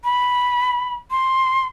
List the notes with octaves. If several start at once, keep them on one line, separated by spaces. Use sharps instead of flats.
B5
C6